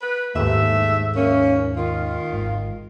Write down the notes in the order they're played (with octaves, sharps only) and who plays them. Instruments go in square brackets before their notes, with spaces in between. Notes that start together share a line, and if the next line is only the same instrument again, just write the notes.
[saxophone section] B4
[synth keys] D#2 G#2 [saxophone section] A3 E5
[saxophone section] A#3 C#4
D#3 F4
[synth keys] G#1